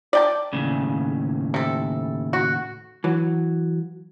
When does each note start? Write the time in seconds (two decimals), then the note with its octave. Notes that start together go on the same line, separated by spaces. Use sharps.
0.13 D5 G5 A5
0.53 D#2 A2 C#3
1.54 C3 A4
2.33 F#4
3.04 E3 F#3